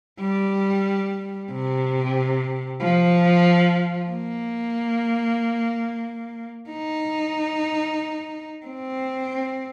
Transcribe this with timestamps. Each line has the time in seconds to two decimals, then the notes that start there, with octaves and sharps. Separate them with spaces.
0.20 G3
1.51 C3
2.81 F3
4.10 A#3
6.70 D#4
8.66 C4